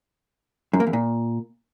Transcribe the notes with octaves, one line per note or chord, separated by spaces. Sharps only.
F#2
A#3
E2
A#2